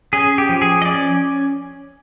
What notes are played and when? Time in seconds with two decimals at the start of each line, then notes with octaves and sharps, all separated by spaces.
0.13 C#4 G#4
0.38 G4
0.49 F3
0.62 G#4
0.82 D#5
0.85 C#4 D5